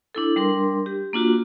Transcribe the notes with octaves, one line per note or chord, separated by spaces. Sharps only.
D4 E4 A4
G3 D4 A#4 C6
G4
A#3 D4 F4 F#4